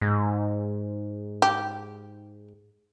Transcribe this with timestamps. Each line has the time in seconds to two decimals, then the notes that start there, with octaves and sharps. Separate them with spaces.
0.01 G#2
1.42 G4